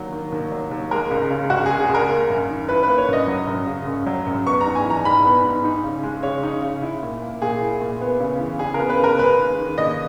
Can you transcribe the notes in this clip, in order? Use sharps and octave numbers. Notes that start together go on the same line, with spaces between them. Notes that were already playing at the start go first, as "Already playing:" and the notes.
Already playing: D#2 F#3
D#3
D#2
F#3
D#2
G#3 A#4
C#2
C#3
C#2 F#4
G#4
G#3
G#4
C#2
A#4
A#3
F#2
D#3
E4 B4
B4
A#3
C#5
F#2 D#5
F#3
F#2
C#3
F#2
F#3
F#2
B3 C#6
A#5
G#2
G#5
E3 A#5
G#2 B5
B3
G#2
D#4
C#3
G#3
C#3 C#5
D#4
C#3
E4
A#2
A#3
A#2 G#4
E4
A#2
B3
C#3
E3
C#3 G#4
A#4
B3
B4
C#3 A#4
G#3 B4
D#2
D#3
D#2 D#5